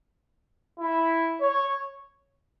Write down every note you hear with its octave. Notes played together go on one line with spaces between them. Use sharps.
E4
C#5